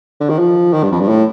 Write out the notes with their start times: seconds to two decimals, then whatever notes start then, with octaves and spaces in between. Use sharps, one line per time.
0.20 D3
0.30 D#3
0.39 F3
0.73 D#3
0.83 G2
0.92 F2
1.00 G2
1.08 A2